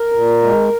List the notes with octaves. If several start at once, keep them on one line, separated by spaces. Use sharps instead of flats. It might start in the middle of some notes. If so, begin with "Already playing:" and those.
Already playing: A#4
A#2
G#3